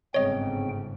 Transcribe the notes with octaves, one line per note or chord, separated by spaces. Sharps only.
G1 G#2 C#3 C4 C#5 D#5 G5